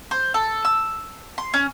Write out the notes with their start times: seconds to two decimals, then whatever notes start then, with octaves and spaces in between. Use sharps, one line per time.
0.11 C5
0.34 A4
0.65 E6
1.38 C6
1.54 C#4